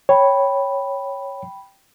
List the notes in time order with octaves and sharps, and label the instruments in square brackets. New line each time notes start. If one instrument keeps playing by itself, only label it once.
[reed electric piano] C#5 [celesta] G5 B5